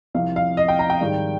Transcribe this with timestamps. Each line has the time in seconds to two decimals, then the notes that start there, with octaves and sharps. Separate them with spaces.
0.14 C2 C3 F3 F5
0.36 F5
0.57 D#5
0.69 G5
0.79 A#5
0.90 G5
1.01 G#2 D#3 G3